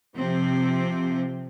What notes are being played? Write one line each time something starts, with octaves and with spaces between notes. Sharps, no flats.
C3 F3 C4